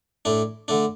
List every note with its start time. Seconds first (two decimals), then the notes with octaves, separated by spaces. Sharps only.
0.25 A2 A3 D4
0.68 D3 A3 D4